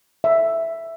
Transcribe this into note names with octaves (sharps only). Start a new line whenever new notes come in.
E5